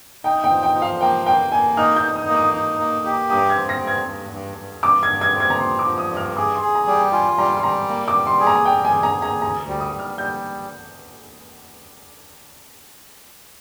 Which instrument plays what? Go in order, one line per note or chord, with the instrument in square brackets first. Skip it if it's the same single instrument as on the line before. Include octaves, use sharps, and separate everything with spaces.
[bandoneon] D#4 [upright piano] G5
[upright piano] G5
[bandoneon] F3
[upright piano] G5
[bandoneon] F3
[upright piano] F5
[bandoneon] A#3 [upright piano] G5
[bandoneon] A#3 [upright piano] G5
[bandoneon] A#3 [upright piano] G#5
[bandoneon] D#4 [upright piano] F6
[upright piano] G6
[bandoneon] D#4
[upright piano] D#6
[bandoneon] A#3
[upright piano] D#6
[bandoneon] D#4
A#3
G4
[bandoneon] G2 [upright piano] D#6
[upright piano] G#6
[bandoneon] C4
[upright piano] A#6
[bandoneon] G2
[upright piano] G#6
[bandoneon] G2
G2
G2
[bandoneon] G2 [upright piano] D6
[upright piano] G#6
[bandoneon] G2
[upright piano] G#6
[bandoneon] C4
[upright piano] G#6
A#5
[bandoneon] F3 [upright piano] C6
[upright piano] D6
[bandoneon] F3
[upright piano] D#6
[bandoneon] G2
[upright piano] F6
[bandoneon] G#4 [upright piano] D6
[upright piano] C6
[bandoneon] G#4
[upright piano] A#5
[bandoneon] G3
[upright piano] G5
[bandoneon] F4 [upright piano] G#5
[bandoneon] G3 [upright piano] A#5
[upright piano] C6
[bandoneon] G3 [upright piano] A#5
[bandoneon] A#3
[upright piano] D6
[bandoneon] G3
[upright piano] C6
[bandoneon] G#4
[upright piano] A#5
[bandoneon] G3 [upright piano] G5
[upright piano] G#5
[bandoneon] G#4
[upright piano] A#5
[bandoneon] G#4
[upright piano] A#5
[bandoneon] D2 [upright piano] A#5
[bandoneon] G3
[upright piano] D#6
[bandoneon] G3
[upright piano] F6
[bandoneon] G3 [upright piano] G6